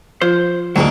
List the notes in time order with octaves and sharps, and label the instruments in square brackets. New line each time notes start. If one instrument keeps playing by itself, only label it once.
[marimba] F3 F4 [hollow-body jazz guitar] C5
[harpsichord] D2 G#2 [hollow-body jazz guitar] F#3 A#3